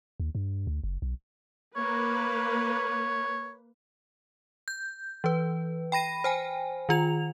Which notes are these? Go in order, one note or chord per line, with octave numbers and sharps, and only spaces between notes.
D#2
G2
D2
F#1
B1
A#3 B4 C#5
G6
E3 B4
G5 B5 A#6 D#7
C5 G5 G#5
D#3 F4 F7